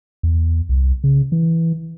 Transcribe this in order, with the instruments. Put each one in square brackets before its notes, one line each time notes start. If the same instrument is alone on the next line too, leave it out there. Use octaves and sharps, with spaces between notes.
[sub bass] E2
C2
C#3
E3